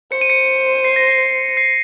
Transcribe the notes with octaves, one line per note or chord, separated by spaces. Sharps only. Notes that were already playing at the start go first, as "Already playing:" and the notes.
C5 C#7
D#7
C#7
C7
A#6
C7
C7